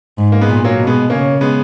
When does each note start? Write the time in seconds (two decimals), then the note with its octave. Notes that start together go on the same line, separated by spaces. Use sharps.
0.18 G#2
0.32 A#3
0.41 G#3 B3
0.49 A#2
0.64 F#3 A#3
0.80 B2
0.87 G#3 B3
1.10 C#3 A#3 C#4
1.41 G#3 B3